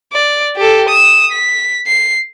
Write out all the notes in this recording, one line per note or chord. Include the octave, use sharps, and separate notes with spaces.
D5
G4 A4
D#6 E7
B6
C7